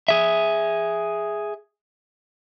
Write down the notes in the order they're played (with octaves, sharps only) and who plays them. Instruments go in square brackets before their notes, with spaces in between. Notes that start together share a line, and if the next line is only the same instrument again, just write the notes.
[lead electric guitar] G#4 E5